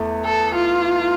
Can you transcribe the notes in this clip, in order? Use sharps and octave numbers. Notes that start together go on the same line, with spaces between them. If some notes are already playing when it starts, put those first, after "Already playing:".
Already playing: E2 A3
A4
F4